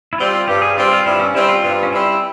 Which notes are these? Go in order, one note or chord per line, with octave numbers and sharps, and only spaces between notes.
E4
G3 C4 F4
G2 G4
G#4
G3 C4 F4
F4
G2 E4
C#4
G3 C4 E4
F4
G2 F4
C#4
G3 C4 E4